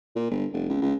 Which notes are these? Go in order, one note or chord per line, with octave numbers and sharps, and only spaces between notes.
A#2
G1
F1
C#2
C#2